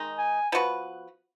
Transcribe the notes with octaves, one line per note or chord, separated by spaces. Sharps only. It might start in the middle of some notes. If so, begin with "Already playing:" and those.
Already playing: D#3 G#3 D#4
G#5
F3 B3 F#4 B4